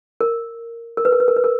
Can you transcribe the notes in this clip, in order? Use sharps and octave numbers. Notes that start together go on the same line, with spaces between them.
A#4
A#4
B4
A#4
B4
A#4
B4
A#4